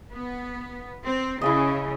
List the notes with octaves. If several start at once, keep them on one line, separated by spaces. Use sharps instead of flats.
B3
C4
C#3 E4 G#4 D#5